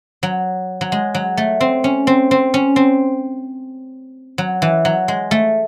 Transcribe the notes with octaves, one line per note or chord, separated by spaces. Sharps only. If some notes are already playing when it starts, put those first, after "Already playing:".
F#3
F#3
G#3
F#3
A3
C4
C#4
C4
C4
C#4
C4
F#3
E3
F#3
G#3
A3